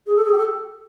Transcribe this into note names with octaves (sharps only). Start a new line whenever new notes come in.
G#4
A4
G#4
G4
A4